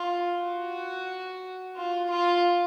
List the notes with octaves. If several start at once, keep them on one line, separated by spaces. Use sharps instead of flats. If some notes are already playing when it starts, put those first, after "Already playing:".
Already playing: F4
F#4
F4
F4